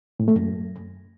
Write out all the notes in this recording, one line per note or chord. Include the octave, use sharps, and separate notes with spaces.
A2
A3
F#2